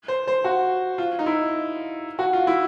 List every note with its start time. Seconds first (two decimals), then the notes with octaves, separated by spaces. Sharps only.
0.08 C5
0.27 C5
0.44 F#4
0.98 F4
1.19 D#4
1.26 E4
2.19 F#4
2.33 F4
2.47 E4